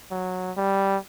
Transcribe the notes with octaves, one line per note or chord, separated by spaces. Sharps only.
F#3
G3